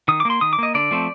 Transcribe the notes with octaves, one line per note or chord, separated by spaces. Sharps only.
D#3 D#6
D6
A#3 C6
D#3 D#6
D6
A#3 D#5
D3 D5
F3 A3 C4